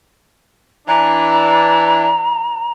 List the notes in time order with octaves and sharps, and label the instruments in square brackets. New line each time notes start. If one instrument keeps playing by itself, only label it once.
[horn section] E3 D4 [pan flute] A#5